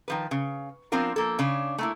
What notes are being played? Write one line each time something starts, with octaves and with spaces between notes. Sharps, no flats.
D#3 F3 B4
C#3
F3 B3 C4 D4 F4 A#4
F3 A#3 A4
C#3 D4 C#5
A3 A#3 E4